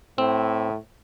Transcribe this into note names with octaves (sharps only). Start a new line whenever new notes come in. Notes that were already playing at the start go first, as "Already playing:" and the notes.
A2 C4